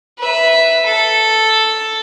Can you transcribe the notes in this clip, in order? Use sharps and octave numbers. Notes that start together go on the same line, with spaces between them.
B4 E5
A4